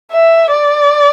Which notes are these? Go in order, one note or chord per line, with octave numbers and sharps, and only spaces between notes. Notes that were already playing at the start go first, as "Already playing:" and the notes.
E5
D5